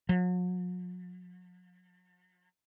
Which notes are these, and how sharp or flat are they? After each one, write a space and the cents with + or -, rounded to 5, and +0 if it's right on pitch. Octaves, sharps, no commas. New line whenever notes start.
F#3 -45